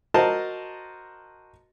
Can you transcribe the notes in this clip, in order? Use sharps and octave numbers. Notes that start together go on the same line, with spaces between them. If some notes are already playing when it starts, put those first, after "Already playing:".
F#4 A#4 C5 D#5 A5